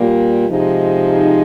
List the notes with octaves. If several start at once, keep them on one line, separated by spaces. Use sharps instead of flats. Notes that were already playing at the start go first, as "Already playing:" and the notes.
Already playing: A#2 G3 A#3
C3 F3 G#3 D#4